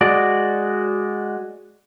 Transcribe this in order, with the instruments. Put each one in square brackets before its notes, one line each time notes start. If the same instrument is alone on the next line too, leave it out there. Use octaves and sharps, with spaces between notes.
[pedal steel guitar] G#3 F#4 D5